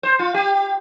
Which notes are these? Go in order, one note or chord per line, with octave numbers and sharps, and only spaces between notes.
C5
F4
G4